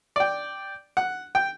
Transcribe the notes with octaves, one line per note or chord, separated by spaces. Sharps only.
D5 G5
F#5
G5